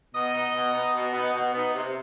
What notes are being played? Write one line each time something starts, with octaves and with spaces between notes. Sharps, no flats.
B2 D#5
B3 D#4
B2
B3 D#4
B2
B3 D#4
B2
B3 D#4
C3